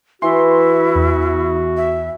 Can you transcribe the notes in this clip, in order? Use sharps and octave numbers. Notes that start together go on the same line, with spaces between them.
E3 E4 F#4 C6
E2
E5